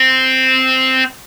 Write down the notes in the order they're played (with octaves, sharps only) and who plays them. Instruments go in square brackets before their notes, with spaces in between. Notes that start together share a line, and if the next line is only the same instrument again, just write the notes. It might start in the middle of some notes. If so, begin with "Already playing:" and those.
Already playing: [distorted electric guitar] C4